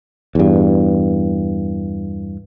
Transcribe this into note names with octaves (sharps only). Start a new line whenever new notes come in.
E2 G2